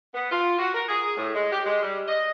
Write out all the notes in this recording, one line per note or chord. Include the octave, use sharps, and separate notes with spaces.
B3
F4
F#4
A#4
G#4
A2
G#3
G4
G#3
G3
D#5